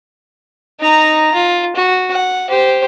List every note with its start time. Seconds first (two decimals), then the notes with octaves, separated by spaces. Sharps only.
0.80 D#4 A#5
1.34 F4
1.76 F#4
2.12 F#5
2.50 G4 C5